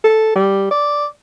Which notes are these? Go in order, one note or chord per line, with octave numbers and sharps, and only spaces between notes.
A4
G3
D5